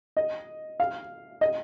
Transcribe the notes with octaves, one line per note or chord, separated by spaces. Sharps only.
D#5
F5
D#5